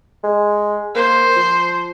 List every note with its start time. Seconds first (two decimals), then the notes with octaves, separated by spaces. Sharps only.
0.24 G#3
0.95 A#3 C5
1.36 F3